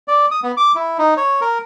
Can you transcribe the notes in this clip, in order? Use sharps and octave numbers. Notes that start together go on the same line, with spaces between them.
D5
D#6
B3
D6
E4
D#4
C#5
A#4